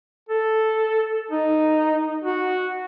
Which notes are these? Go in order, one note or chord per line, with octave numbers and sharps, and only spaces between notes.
A4
D#4
F#4